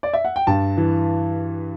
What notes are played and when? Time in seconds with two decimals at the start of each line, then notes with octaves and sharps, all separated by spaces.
0.03 D5
0.13 E5
0.25 F#5
0.36 G5
0.47 G2 A5
0.77 E3